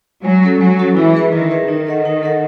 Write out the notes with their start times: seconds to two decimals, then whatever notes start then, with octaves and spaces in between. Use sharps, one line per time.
0.25 F#3 G#3
0.43 C#4 F#4 A4
0.61 F#3 G#3
0.79 C#4 F#4 A4
0.97 E3 E4
1.15 G#4 B4 E5
1.33 D#3 E4
1.51 G#4 B4 E5
1.68 D#3 D#4
1.87 A4 D#5 F#5
2.05 D#4
2.23 A4 D#5 F#5